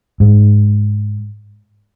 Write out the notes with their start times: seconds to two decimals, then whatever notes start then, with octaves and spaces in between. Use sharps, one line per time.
0.20 G#2